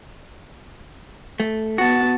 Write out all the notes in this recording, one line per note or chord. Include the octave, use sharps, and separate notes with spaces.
A3
B3 F#4 A5